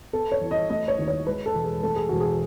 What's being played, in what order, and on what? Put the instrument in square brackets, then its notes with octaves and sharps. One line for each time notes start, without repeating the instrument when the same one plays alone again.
[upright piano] B3 A4
C#5
E2
D#5
A3 D#5
C#5
D#2
C#5
G#3 B4
A4
E1
G#4
A3 A4
G#4
E1 F#4
G#4